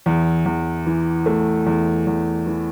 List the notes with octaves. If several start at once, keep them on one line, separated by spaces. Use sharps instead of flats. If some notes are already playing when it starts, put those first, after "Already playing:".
E2
E2
E3
A3
E2
E2
E3